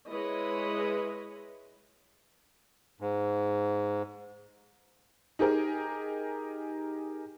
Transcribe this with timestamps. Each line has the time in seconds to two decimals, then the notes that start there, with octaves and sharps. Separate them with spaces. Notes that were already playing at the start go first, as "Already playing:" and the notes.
0.11 G#3 E4 B4 C#5 D#5
3.01 G#2
5.39 D#4 G4 G#4 A#4